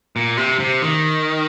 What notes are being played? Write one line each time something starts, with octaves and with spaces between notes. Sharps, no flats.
A#2
C3
C3
D#3